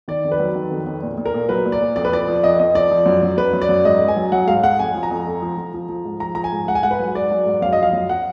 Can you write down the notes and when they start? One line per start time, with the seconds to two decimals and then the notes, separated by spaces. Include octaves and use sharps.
0.08 D#3 D5
0.24 F2
0.32 B4
0.39 F#3
0.55 D#3
0.71 F2
0.86 F2
1.03 A#2
1.17 A#2
1.25 A#4
1.34 A#2
1.49 F#3 B4
1.65 A#2
1.72 D5
1.81 A#2
1.96 F2 D5
2.05 B4
2.12 F3 D5
2.28 F3
2.43 F2 D#5
2.59 F2 D#5
2.74 F3 D5
2.91 F3
3.06 F#2
3.22 F#2
3.37 F#2 B4
3.53 F#2
3.62 D5
3.69 F#2
3.85 G#2 D#5
4.01 G#2
4.08 G#5
4.16 F#3
4.32 F#3 F#5
4.47 G#2 F5
4.63 G#2 F#5
4.79 F2 G#5
4.95 F3
5.03 A#5
5.11 F2
5.26 F2
5.42 F3
5.57 F3
5.74 F3
5.89 F3
6.05 G#2
6.20 F3 A#5
6.35 F3 A#5
6.44 G#5
6.52 G#2
6.67 G#2 F#5
6.75 G#5
6.83 G#2 F#5
6.91 B4
6.99 F#3
7.14 G#2 D5
7.31 F#3
7.46 G#2
7.61 F#2 F5
7.72 F3 D#5
7.83 F5
7.93 F#2
8.09 F#5